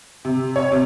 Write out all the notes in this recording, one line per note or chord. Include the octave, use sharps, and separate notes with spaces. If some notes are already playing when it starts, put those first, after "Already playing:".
C3
C#5
C3